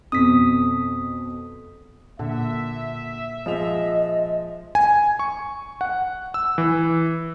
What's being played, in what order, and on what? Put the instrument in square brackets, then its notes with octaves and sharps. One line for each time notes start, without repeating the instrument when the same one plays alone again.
[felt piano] F2 B2 [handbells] D#6 B6
[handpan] A#2 F#5 [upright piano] D3 [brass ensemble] E5
[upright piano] F3 G#3 F7 [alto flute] D#5
[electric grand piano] G#5
C#6
F#5
E6
E3